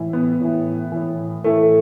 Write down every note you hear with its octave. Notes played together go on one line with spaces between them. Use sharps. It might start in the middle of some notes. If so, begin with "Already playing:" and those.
Already playing: A2 E3
B3
A2 E3
A2 E3
A2 E3 A3